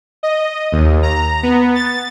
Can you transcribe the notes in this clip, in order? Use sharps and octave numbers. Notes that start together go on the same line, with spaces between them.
D#5
D#2
A#5
B3
A6